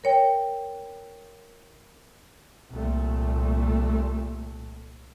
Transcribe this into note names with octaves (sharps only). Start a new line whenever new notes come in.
A#4 C#5 G5
C2 A#2 A3